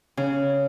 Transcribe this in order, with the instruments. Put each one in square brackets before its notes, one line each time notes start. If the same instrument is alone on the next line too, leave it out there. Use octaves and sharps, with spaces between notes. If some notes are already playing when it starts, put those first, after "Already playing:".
[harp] C#3